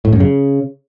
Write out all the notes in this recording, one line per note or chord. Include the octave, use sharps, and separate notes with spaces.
A2
F#2
C#3